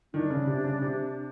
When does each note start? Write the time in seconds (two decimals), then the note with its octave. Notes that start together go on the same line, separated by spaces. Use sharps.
0.13 D#3 D4
0.30 C#3
0.47 C3
0.64 C#3
0.82 C3